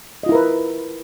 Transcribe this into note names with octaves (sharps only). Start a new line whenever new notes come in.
E4 F4 A#4 B4 D#5